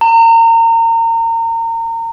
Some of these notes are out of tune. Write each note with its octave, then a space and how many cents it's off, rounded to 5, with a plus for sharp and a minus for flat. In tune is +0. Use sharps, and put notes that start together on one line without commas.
A#5 -30